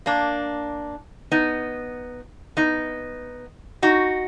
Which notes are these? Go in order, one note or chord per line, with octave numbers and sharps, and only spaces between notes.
A#3 D4
B3 D#4
B3 D#4
D#4 F#4